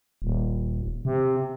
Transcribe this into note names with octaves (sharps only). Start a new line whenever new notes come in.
D#1
C3